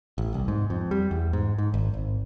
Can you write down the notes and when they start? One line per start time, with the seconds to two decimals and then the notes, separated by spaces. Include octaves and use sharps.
0.18 A1
0.34 C2
0.48 G#2
0.70 F2
0.91 G3
1.11 E2
1.33 G#2
1.58 G#2
1.74 G#1
1.94 G#1